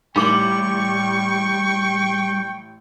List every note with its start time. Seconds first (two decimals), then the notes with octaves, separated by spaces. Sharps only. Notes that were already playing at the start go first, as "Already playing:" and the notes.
0.16 A1 G3 G5 C#6 D6 F#7